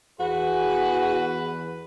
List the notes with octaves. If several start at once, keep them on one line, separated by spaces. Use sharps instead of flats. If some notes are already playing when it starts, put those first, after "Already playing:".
E2 F#4 G#4 B4